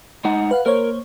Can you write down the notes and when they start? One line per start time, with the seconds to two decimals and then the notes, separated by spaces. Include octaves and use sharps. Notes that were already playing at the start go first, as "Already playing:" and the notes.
0.25 G#3 D#4 F#5
0.51 B4 F5 F#5
0.66 A#3 A#4 C5 C#5